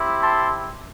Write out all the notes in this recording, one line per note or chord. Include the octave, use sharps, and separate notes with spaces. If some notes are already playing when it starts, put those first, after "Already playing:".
Already playing: C4 E4 G4
A5 C6